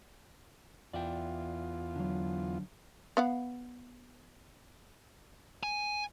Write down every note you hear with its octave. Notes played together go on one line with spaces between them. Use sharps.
E2 F4 D5 E5 G5
D3 F#3
B3 F5 F#5
G#5